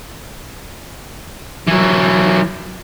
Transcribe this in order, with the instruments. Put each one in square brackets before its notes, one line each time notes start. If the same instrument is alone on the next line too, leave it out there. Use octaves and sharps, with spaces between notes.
[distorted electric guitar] E3 F#3